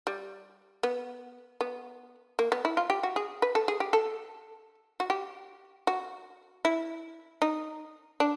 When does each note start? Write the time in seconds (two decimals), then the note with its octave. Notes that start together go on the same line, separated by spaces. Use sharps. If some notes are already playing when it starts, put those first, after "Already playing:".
0.07 G3
0.83 B3
1.61 B3
2.39 A#3
2.52 B3
2.65 E4
2.77 F4
2.90 G4
3.03 F#4
3.16 G#4
3.42 B4
3.55 A4
3.68 G#4
3.80 G4
3.93 A4
5.00 F#4
5.10 G4
5.87 F#4
6.65 E4
7.42 D#4
8.20 D4